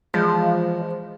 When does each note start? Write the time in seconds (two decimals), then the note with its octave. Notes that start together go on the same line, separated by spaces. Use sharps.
0.14 E2 F3 G#3